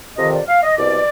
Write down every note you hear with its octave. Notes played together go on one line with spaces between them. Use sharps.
F2 C3 D#3 D#5
D5
F5
D#5
C2 B2 D5